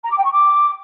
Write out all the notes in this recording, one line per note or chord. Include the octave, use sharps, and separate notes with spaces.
A#5
D6
G5
C#6
D6